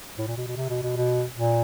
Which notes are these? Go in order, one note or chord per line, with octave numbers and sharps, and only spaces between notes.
A2
A#2
B2
B2
C3
B2
B2
B2
A#2